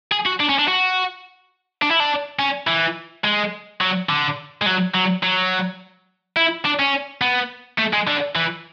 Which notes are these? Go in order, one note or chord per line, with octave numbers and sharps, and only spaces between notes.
G#4
F#4
D4
C#4
D4
F#4
D4
E4
D4
C#4
E3
G#3
F#3
D3
G#3
F#3
F#3
F#3
E4
D4
C#4
B3
A3
G#3
D3
E3